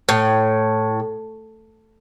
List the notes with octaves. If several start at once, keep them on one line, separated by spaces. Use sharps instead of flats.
A2